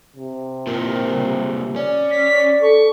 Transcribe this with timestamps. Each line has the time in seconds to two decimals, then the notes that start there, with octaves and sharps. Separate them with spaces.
0.17 C3
0.67 A#2 C4 E4 F4 A#4
1.11 C#3 G3
1.76 C#4 D5
2.11 B6
2.62 A4 C#6